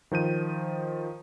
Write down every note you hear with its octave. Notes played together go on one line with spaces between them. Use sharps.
D#3 F3 G6 D#7